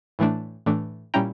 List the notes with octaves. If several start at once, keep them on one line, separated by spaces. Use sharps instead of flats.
A2 E3 A3 D4
A2 E3 A3 D4
A#2 G3 C#4 E4 G5 A#5